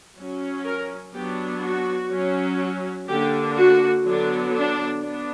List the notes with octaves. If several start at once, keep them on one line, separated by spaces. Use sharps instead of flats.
F#3 C#4
A#4
F#3 B3 D4 G4
F#4
F#3 C#4
D3 A#3 D4 G4
F#4
D3 F#3 B3 D4
D4
B3 D4